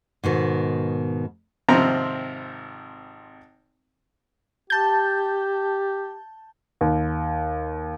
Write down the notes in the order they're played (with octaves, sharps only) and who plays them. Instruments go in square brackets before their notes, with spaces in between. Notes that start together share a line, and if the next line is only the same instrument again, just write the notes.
[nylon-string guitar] G#2 B2 D#3
[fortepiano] G#1 C3 F3 C4 A#5
[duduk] G4 [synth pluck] A5 G6
[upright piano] D#2